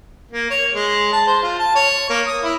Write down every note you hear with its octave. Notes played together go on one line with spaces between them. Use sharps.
A#3
C#5
G#3
A5
C5
F4
A5
C#5
A#3
D#6
E4